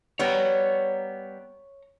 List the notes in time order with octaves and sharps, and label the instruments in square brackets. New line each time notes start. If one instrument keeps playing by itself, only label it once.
[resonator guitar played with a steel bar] G3 B3 [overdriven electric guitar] C#5 A#5